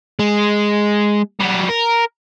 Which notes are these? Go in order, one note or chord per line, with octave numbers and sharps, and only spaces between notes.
G#3
F#3 G3
A#4